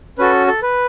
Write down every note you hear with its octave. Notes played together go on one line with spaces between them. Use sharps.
C#4 F#4 A4 B4
A4
B4